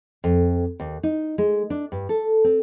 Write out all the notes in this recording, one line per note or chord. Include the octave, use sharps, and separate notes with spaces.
F2
D#2
D#4
G#3
D4
G2
A4
C4